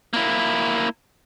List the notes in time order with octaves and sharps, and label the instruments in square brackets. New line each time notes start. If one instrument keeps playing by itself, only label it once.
[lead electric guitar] A#3 E4